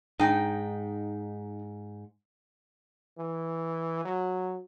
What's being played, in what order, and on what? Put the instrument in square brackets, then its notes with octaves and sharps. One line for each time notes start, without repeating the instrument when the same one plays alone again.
[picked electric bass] G#2 [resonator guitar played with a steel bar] D#4 G5
[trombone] E3
F#3